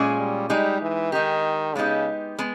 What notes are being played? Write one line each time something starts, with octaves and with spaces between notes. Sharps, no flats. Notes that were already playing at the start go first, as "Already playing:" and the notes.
Already playing: A#2 G#3 C#4 G#4
G3
G3 G#3 D#4 G4
E3
D#3 G#3 D#4 G4
C#3 G#3 B3 D#4 G4
G#3 B3